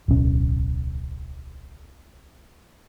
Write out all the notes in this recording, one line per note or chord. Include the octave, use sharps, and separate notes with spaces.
D1 B1 C#4